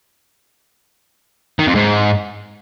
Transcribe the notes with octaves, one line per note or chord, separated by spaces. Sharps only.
D#3
F2
G#2